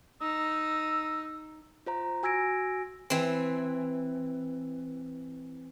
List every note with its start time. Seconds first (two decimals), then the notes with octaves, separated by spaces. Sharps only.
0.21 D#4 E6
1.86 F4 C5 A#5
2.23 F#4 G#5 E6 G#6 A#6 D7
3.10 E3 C4